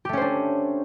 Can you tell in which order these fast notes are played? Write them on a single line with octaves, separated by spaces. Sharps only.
G4 A3 C#4 C5 D4